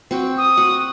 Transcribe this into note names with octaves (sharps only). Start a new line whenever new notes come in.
C4 F#4 G5
D#6
F#4 F#5